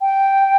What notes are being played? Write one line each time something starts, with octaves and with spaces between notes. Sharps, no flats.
G5